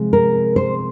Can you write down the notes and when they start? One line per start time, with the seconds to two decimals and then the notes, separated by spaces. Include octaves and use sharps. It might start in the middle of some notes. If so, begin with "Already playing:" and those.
Already playing: C3 F3 G#3
0.13 A#4
0.56 C5